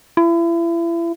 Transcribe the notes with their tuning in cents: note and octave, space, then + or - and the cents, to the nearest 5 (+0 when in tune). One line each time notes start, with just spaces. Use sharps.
E4 +35